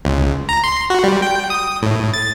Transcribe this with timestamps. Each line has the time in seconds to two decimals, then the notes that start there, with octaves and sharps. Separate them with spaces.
0.05 C#2
0.49 A#5
0.64 C6
0.90 F#4
1.04 G3
1.22 G5
1.50 D#6
1.82 A2
2.14 A6